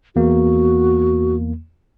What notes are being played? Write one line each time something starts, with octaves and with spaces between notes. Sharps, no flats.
E2 A#3 F#4